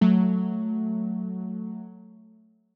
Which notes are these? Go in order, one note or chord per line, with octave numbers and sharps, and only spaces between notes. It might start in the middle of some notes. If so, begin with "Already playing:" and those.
F#3 A3